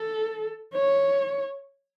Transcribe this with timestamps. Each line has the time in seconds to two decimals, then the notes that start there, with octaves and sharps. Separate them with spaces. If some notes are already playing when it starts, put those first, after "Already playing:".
Already playing: A4
0.74 C#5